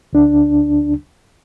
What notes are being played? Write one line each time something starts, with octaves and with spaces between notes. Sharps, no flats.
D2 D4